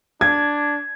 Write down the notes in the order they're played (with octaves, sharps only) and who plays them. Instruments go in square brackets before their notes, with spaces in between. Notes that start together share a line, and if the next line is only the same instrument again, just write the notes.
[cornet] D4 [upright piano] G#6